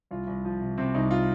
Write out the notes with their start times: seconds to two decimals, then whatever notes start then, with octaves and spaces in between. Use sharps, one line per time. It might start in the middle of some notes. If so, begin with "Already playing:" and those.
0.11 C2 F4
0.27 C2
0.45 F3
0.61 C3
0.78 C3 C4
0.94 C2 D#4
1.11 F4